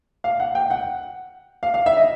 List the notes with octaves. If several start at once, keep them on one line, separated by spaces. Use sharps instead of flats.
F5
F#5
G5
F#5
F5
F5
E5
D#5